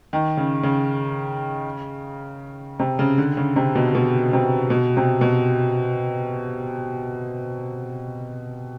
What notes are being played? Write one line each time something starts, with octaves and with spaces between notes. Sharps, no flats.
D#3
C#3
C#3
C3
C#3
D3
C#3
C3
B2
B2
C3
B2
C3
B2